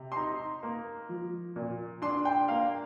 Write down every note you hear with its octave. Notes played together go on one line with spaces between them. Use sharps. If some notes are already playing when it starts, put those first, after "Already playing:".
Already playing: C3
C6
D#4 A#5
A#3
F3
A#2
D4 C6
G5
A#3 F5